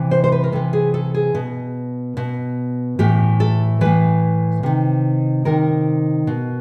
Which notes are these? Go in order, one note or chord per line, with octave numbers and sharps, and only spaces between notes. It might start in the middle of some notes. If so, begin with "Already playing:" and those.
Already playing: C3 E3
C5
C5
B4
A#4
C3 E3 A4
G#4
A4
G#4
B2
B2
A2 E3 G4
A4
A2 E3 B4
C3 D#3
C3 D#3 A#4
B2